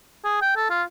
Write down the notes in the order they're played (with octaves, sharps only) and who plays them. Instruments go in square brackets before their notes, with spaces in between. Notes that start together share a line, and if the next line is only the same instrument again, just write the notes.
[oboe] G#4
G5
A4
F4